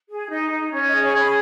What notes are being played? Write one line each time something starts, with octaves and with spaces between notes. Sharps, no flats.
G#4
D#4
D#4
C#4
D#5
G#4
C#5
C#4 C#6
G#5 B5